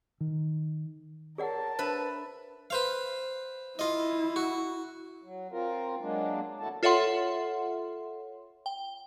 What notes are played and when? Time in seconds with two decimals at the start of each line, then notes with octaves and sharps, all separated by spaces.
0.20 D#3
1.38 G#4 A#4 C#5 D5 F#5 A5
1.79 D4 B4 C5 E5
2.70 B4 C5 F5
3.79 E4 F4 D#5
4.36 F#4
5.24 F#3
5.52 C4 F4 A#4
6.01 F#3 G#3 A#3 D4
6.60 E2 A2 E4 F#4 A4 A5
6.83 F4 A4 C#5 E5 F#5 C6
8.66 G5